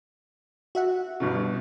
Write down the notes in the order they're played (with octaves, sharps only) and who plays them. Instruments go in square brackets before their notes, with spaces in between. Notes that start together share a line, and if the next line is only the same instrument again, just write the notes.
[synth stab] F#4 E5 F#5
[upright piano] G1 G2 B2